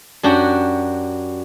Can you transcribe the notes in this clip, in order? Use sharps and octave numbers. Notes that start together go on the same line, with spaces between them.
F#2 D4 F#4 G4 F#5